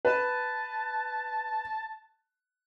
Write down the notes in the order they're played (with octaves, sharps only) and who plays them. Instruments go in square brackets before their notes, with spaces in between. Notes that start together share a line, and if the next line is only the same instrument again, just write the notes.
[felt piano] B4 [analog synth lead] A5